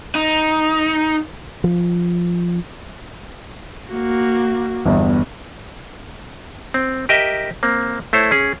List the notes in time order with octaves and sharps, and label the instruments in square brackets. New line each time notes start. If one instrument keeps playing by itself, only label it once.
[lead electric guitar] D#4
[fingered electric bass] F3
[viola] A#3 F#4
[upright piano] G1 E2
[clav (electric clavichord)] C4
G4 A#4 D#5 E5
A#3 C4
A3 E4 C5 C#5
C#4 G#4 C#5